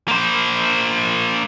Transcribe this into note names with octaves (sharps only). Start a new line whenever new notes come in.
A#3 C5